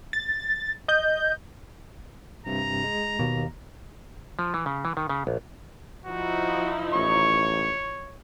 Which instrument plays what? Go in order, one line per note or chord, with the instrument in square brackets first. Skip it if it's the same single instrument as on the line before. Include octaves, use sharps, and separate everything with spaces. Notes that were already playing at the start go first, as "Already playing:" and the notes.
[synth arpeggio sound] A6
D#5 G6
[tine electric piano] G2 C3 [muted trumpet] A#5
[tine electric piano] G#3
[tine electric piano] D#2 A#3 [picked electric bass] B2
[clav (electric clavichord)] F3
E3
C#3
E3
D#3
C#3
A#1
[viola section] F3 D#4 E4 [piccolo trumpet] F#4
[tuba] A1 [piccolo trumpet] C#5 [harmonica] C#6